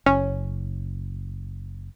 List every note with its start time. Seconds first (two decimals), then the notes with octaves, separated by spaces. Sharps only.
0.06 F#1 C#4